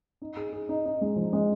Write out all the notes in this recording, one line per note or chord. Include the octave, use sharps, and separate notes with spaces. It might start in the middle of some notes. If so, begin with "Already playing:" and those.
D#4
G#4
G#4
D#4
D#4
G#3
F3
G#3